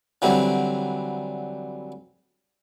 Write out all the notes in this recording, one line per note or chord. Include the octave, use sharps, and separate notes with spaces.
D3 E3 F#3 G3 C4